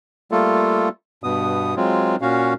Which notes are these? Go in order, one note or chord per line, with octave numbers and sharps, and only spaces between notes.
G3 A3 A#3 F4 A4
G2 B2 B3 D#6
F#3 G#3 C4 F4
A#2 C#4 F#4 F5